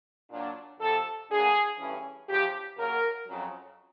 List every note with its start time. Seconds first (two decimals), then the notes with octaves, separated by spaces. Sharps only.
0.30 A#2 F#3 A#3 D4
0.80 F2 C3 F3 A4
1.29 D2 D3 F#3 A#3 G#4
1.78 G2 E3 A3 C#4
2.27 E2 C#3 F3 G4
2.76 F#2 C#3 F#3 A#3 A#4
3.26 F2 C#3 F#3